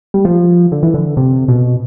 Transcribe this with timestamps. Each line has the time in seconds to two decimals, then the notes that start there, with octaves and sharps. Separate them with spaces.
0.14 G3
0.25 F3
0.72 D3
0.83 E3
0.94 D3
1.17 C3
1.48 B2